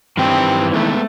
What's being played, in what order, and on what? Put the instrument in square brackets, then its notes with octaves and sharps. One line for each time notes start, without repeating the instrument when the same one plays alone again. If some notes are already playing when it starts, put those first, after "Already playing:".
[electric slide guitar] G2 G4 [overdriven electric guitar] D#3 E3 [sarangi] C4
[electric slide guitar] G#3 B3 [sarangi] A3